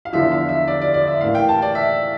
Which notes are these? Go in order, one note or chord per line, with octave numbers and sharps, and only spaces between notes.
F5
E2 D3 F3 E5
F5
E5
D5
D5
D5
E5
A2 E3 A#3 F5
G5
A5
D5
E5